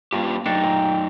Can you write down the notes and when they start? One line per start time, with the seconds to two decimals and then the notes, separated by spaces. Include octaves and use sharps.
0.13 G2 A#3 F4 G4
0.46 F#2 D4 D#4 A4 G5
0.64 A#2